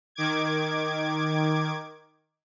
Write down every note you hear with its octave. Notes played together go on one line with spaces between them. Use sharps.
D#3 D6 G#6